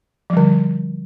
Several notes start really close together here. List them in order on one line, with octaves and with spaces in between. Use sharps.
F3 G3 D3